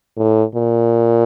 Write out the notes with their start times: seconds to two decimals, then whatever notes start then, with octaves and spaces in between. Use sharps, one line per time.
0.17 A2
0.55 A#2